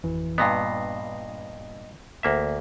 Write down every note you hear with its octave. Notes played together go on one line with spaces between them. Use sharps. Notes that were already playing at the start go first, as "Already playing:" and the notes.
G#1 F2 E3
G2 A#2 B3 D#5 A#6 C7
D2 A#3 E5